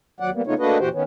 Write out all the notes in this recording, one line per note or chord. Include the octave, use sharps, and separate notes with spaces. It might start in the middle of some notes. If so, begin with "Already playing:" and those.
D#2 F#3 D5 F#5
G3 A#3 B3
C#3 A3 B3 D#4 F4 C#5
A3 A#3 D4 F#4 B4 D#5
F2 A#2 E3 F#4 G4 C5
D#3 B3 C#4